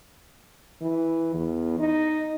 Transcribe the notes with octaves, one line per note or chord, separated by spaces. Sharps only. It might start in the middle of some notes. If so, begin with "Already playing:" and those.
E3
E2
D#4